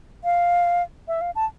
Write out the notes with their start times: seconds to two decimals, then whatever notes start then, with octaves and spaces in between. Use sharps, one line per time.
0.24 F5
1.08 E5
1.21 F5
1.36 A5